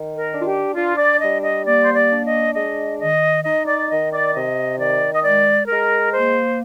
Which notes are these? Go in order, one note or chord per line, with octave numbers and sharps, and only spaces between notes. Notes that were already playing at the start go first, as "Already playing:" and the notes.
Already playing: D#3
A#4
D4
F4
G4
D4 F4
D5
G3 D#5
D#5
A#3 D5
C5
D5
D4
D#5
G#3 D#5
D#3 D#5
D#4 D#5
D5
D#3 D#5
D5
C3 D#5
D#3 D5
D#5
G#3 D5
G#3 A#4
A#3 C5